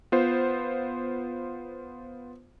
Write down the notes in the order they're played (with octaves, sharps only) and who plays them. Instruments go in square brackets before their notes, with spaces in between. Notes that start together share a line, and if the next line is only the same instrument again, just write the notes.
[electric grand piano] B3 F4 C5